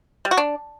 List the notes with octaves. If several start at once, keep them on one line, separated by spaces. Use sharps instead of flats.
G3
F#4
D4